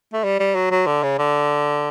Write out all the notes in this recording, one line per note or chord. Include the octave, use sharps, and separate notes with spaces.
A3
G3
G3
F#3
F#3
D3
C#3
D3